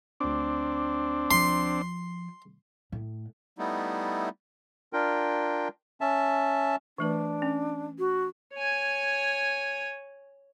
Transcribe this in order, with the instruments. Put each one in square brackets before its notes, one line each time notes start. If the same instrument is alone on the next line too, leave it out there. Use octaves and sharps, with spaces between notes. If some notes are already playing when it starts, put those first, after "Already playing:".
[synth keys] D2 D6 [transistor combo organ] C4 D4
[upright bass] F3 [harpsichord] C6
[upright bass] A2
[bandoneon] G3 A3 B3 D#4 E4
[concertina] D4 F4 A#4 G5
C#4 E5 A5
[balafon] E3 A3 B4 [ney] D4
[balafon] C#4
[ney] F#4
[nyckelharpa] C#5 G#5